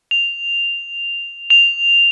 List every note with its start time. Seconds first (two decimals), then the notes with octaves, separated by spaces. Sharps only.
0.11 F7
1.50 F7